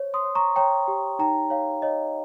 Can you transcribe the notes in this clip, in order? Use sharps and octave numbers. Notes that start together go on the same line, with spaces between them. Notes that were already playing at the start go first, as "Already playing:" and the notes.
Already playing: C5 C#5
C6 D#6
C#5
A#5 C#6
C#5 G5 A#5
G4
D#4 G5 A#5
C#5 F5
C#5 D#5